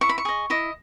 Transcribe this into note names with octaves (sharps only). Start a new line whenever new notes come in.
E4 C#6
B5
C#6
G#4 D#5
E4 D#5